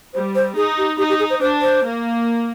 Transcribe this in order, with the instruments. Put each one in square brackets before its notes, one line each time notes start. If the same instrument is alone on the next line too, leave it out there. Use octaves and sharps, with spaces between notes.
[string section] G3 [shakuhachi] C5
[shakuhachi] C5
[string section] D#4 [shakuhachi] G#4
[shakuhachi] G4
[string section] D#4 [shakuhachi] G4
[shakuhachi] G4
G#4
C5
[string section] D4 [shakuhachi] C5
[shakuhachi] C5
[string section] A#3